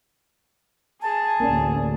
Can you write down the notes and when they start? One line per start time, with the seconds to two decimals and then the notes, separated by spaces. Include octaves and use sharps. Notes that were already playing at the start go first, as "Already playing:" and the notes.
1.02 G#4 A5
1.40 A1 D2 A#3 C#4 D5